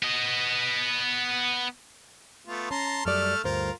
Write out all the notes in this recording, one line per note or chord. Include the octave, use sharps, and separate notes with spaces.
B3 D#5
A3 B3 F4
C#4 A5 A#5 C6
F#2 G3 A3 A4 D5 F6
D2 G2 F4 A#4 C5